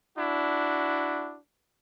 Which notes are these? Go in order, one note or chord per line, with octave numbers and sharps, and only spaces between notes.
D4 E4 F#4